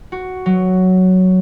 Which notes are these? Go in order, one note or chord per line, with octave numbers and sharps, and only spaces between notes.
F#4
F#3